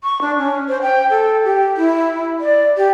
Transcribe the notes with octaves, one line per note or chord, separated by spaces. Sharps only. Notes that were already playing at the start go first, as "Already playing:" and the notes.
C#6
D4
C#4
C5
G5
A4
G4
E4
D5
G4